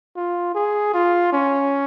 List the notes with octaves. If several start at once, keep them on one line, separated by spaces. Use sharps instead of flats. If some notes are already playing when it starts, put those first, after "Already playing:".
F4
G#4
F4
C#4